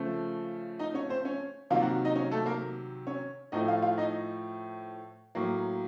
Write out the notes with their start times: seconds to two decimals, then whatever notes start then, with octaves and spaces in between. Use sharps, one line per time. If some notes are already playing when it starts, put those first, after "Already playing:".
Already playing: C#3 F3 A3
0.79 D#4 D#5
0.94 C#4 C#5
1.09 C4 C5
1.25 C#4 C#5
1.71 C3 D#3 F#3 A#3 F4 F5
1.82 F#4 F#5
2.05 D#4 D#5
2.15 C#4 C#5
2.31 A3 A4
2.46 A#3 A#4
3.07 C#4 C#5
3.52 A2 F3 A3 D#4 D#5
3.67 F4 F5
3.82 F4 F5
3.98 D#4 D#5
5.35 A2 F#3 A#3